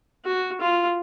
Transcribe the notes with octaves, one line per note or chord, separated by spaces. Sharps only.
F#4
F4